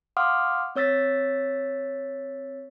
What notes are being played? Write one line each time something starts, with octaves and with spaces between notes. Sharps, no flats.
F5 F#5 C6 D6 D#6 F6
C4 C#5 E6 A6 B6